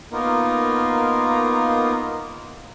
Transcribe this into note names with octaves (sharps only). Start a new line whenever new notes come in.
A#3 B3 D#4 F4 A#4